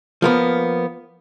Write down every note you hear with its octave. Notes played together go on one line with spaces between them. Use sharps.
F3 A#3 B3